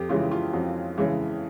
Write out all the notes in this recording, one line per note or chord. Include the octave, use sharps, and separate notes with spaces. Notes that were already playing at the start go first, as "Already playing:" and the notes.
Already playing: F2 G4 A4
C#3 E3 G#3 F4
F4
F2 F#4
C#3 E3 G#3